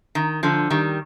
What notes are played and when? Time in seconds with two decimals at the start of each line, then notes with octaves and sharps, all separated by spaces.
0.15 D#3
0.43 D3 F3
0.70 D#3 G3